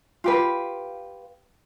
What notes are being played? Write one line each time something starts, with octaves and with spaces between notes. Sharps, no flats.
F4 G4 B4